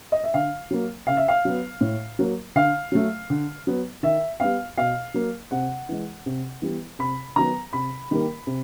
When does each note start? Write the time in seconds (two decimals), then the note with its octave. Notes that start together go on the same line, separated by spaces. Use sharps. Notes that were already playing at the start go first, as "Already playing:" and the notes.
0.12 D#5
0.24 E5
0.34 D3 F5
0.71 F#3 A#3
1.07 C#3 F5
1.17 E5
1.28 F5
1.45 F#3 B3
1.81 A2
2.19 F#3 A#3
2.56 D3 F5
2.92 F#3 A3
3.30 D3
3.67 F#3 B3
4.03 D#3 E5
4.40 G3 B3 F5
4.78 B2 F5
5.14 F#3 A#3
5.51 C3 F#5
5.89 E3 G#3
6.26 C3
6.62 E3 G3 B3
6.99 C3 B5
7.36 D#3 F#3 B3 A#5
7.73 C3 B5
8.11 D#3 G3 A#3
8.47 C3